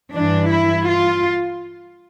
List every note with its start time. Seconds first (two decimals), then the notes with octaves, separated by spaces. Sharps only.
0.13 G2 E3 D4
0.50 E4
0.87 F4